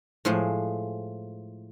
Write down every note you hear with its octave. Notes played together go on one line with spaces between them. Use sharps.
A2 F3 G#3